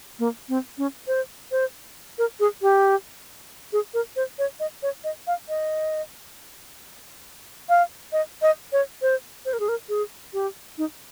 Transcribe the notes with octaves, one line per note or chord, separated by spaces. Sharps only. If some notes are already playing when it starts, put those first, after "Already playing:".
A#3
C4
C#4
C5
C5
A#4
G#4
G4
G#4
A#4
C5
C#5
D#5
C#5
D#5
F5
D#5
F5
D#5
D#5
C#5
C5
C5
A#4
G#4
A#4
G#4
G4
D#4